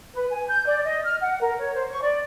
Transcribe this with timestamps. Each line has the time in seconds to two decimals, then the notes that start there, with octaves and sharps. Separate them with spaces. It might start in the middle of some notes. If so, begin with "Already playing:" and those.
0.15 B4
0.31 G#5
0.48 G6
0.67 D5
0.84 D#5
1.05 F6
1.21 F#5
1.41 A#4
1.59 C#5
1.74 C5
1.89 C#6
2.02 D5